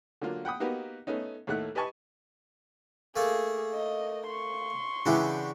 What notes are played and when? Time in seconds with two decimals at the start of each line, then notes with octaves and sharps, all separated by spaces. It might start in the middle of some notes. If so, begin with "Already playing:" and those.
0.22 D3 F#3 A#3 F4
0.45 F#5 G5 B5 D#6
0.60 A#3 B3 D#4 F#4 G4 B4
1.07 A3 B3 C#4 D#4
1.47 D#2 A2 A3 F#5 F#6
1.75 G4 B4 D#5 G#5 A5 C#6
3.16 A3 A#3 G#4 A4
3.74 D#5
4.27 C6 C#6
5.06 C#3 E3 D4 E4 F#4 G4